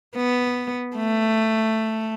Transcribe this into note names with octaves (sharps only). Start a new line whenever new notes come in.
B3
A3